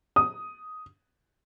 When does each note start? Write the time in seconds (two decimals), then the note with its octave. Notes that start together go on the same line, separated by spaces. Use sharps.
0.16 D#6